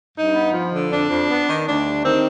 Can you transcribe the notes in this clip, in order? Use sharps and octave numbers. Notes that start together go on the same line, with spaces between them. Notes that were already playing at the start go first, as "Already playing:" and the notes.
G2 D#4
B3
F3
D3
F2 D4
F2
B3
D#3
D2 D4
G3
D#3 C4